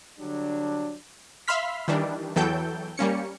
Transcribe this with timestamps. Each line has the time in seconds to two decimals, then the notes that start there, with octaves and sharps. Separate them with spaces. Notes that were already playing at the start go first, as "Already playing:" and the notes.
0.19 D3 F#3 G3 D4
1.48 E5 F5 B5 C6 F6 B6
1.88 D#3 E3 G3 D4
2.36 E2 E3 F#3 A4 G5 G6
2.97 G3 A#3 C#4 C#7